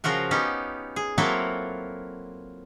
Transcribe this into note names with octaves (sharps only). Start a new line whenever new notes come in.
C#3 F3 F4 F#4 A#4
B3 C#4 D#4 G4
G#4
F#3 A#3 C4 E4 F4 A4